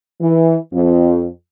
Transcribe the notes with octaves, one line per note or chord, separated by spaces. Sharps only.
E3
F2